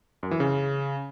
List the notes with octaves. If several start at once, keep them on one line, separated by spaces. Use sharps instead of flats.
F#2
E3
C#3